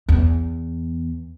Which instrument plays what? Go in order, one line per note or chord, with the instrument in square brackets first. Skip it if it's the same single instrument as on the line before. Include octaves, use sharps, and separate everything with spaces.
[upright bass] E2